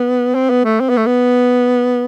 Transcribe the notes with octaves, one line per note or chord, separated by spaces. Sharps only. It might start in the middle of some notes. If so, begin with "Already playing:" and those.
Already playing: B3
C4
B3
A3
C4
B3
A3
B3